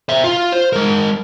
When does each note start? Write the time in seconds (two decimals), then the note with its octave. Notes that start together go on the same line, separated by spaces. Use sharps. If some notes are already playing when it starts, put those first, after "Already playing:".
0.09 C5 E5
0.24 F4
0.52 C5
0.73 G#3 A#4